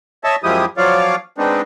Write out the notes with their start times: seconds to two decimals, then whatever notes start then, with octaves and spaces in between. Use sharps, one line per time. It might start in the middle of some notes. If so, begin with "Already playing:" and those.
0.24 C#5 D#5 E5 A5
0.44 F#2 F3 G#3 E4 G4 D#6
0.77 F3 F#3 F4 C#5 D5 F5
1.38 G#3 B3 C4 D4 D#4